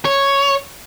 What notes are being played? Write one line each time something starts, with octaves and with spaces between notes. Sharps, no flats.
C#5